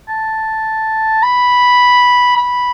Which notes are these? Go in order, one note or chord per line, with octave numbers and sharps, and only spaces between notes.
A5
B5
B5